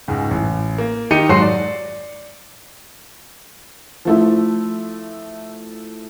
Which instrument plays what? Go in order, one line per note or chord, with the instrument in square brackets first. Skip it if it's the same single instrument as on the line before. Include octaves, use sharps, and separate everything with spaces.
[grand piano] C#2 G#2
A1
A#3
D#3 D#4 G4 C#7 D#7
G#2 F#3 F#4 C6 C7
D5
F3 A3 E4